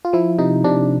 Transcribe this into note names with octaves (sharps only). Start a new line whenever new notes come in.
F4
F3 E4
C3 D#4
C3 D4